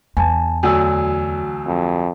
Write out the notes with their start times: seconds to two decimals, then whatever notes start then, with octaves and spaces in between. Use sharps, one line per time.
0.17 E2 G#5 A5
0.63 D2 F#3 G#5 E6
1.67 F2